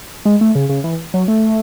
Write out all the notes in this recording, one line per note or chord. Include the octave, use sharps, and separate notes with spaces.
G#3
A3
C#3
C#3
E3
F#3
A3